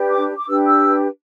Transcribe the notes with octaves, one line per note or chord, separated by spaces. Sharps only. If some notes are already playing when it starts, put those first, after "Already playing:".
Already playing: D4 G4 B4
D6
D6
D4 G4 B4 E6
E6